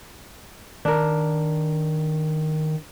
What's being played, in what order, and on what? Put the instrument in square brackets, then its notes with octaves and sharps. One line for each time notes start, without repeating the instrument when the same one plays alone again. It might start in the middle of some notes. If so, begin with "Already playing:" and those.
[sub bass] D#3 [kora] D4 A#4